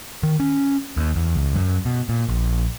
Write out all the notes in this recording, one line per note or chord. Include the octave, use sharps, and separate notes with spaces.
D#3
C#4
D#2
E2
C#2
F#2
B2
A#2
A#1